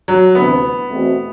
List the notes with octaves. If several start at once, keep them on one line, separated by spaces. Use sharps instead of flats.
F#3
D2 C3 E3 B3
E2 B2 A3 C4 F#4